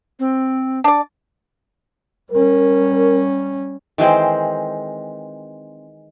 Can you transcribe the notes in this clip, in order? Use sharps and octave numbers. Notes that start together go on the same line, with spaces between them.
C4
D4 D5
G3 C#4 A#4
D#3 E3 G#3 C4